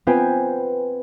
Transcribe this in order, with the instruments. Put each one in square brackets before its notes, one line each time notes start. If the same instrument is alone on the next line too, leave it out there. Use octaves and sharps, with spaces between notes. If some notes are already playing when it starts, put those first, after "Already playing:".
[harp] B3 C4 F4 B4 G5 G#5